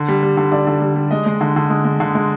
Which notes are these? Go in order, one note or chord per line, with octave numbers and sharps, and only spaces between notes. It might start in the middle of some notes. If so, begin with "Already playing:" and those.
Already playing: D3
G3
G3
D3
D3 D5
D3
G3
G3
G#3 D#5
G#3
D3
D3
G#3
G#3
D3
G#3